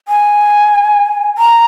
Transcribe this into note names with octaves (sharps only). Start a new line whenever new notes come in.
G#5
A#5